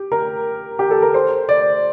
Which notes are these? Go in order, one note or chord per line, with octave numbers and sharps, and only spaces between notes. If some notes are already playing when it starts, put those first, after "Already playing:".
Already playing: G4
A#4
G4
A4
A#4
C5
D5